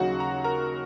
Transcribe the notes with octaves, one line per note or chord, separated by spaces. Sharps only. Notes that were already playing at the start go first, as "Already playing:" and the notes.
Already playing: D#2 C#3 F#3 D#4 F#4 F#5
A#5
A#4 A#5